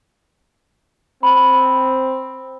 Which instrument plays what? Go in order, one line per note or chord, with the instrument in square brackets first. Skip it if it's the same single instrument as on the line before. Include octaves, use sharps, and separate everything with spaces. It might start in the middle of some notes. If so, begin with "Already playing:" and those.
[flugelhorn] C4 [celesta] B5